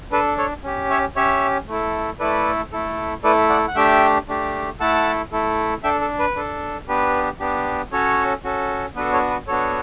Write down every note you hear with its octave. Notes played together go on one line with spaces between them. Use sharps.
D4 A4 B4
A4 C#5
C#4 G4
C#5 E5
C#4 G4 C#5 E5
A3 E4 A4
A3 E4 A4 B4 D5
A3 E4 A4
A3 E4 A4 B4 D5
D5 F#5
F#5
A3 D4 G4 E5 G5
A3 D4 G4
A3 E4 A4 F#5 A5
A3 E4 A4
D4 A4 E5 G5
A4
B4
D4 A4
B3 D4 G4 B4
B3 D4 G4
C#4 F#4 A4 C#5
C#4 F#4 A4
B3 D4 F#4 A4 B4
A4 C#5
B4
B3 D4 F#4 A4 C#5